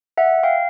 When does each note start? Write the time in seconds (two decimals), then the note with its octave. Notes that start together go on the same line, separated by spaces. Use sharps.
0.18 E5 F#5
0.43 F5 G5